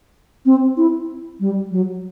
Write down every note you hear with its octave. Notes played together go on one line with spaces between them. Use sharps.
C4
E4
G3
F#3